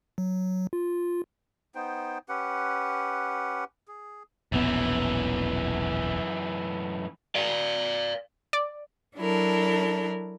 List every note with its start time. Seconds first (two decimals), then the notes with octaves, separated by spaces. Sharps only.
0.18 F#3
0.73 F4
1.75 B3 D#4 C5 G5
2.29 C#4 G4 B4 F#5
3.88 G#4
4.52 E1 A#1 F#2 E3 B3
7.35 D5 F5
8.53 D5
9.16 F#3 D4 E4 A4 A#4